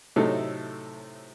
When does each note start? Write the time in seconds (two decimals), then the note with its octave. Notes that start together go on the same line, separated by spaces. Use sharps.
0.16 A2 C3 F#3 A3 D#4 A4